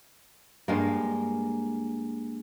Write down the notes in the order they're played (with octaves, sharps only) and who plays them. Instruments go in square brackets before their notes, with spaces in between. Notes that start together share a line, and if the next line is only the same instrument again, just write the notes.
[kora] G2 G#3 A#3